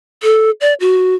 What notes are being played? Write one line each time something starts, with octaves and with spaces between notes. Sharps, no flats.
A4
D5
F#4